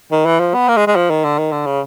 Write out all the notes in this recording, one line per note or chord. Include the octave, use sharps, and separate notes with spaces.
D#3
E3
F3
B3
A#3
G#3
G#3
F3
D#3
D3
D#3
D3
C#3